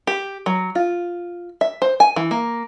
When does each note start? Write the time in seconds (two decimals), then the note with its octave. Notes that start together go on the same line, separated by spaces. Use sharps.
0.07 G4
0.46 F#3
0.75 F4
1.61 E5
1.82 C5
2.00 G#5
2.16 E3
2.31 A#3